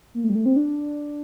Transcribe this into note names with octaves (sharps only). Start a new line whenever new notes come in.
A#3
A3
G3
A3
C4
D4